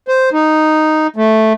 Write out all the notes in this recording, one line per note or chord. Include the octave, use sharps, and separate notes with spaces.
C5
D#4
A3